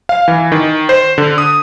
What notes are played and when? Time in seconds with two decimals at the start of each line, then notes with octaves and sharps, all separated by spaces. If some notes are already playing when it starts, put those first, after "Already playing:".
0.09 F5
0.28 E3
0.52 D#3
0.89 C5
1.18 D3
1.38 D#6